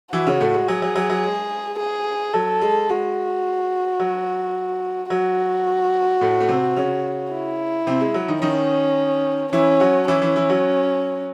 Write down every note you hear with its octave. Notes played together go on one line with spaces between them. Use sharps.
E3 E4 F#4
C#3 C#4
A2 A3
G#3
F#3 G#4
F#3
F#3
F#3
G#3
G#4
F#3 A4
G#3
G#3 F#4
F#3
F#3 F#4
A2 A3
A3
C3 C4
C#3 C#4
E4
C3 C4
G#3
F#3
D#3 D#4
D#3 C#4 D#4
E3 C#4 E4
F#3 F#4
E3 C#4 E4
E3 E4
E3 E4
F#3 F#4